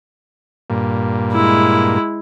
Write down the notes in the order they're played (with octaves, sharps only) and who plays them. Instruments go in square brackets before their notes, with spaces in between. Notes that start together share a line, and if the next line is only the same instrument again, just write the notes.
[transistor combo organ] G2 A#2
[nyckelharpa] G#3 E4